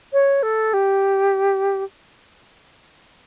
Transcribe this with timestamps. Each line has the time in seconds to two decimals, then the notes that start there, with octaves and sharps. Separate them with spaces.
0.13 C#5
0.43 A4
0.74 G4